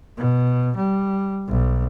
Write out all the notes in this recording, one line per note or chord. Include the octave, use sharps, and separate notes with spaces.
B2
G3
B1